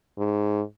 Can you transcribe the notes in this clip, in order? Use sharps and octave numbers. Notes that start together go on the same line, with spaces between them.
G#2